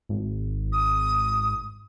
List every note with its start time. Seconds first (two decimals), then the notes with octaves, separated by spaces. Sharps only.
0.09 G#1
0.73 D#6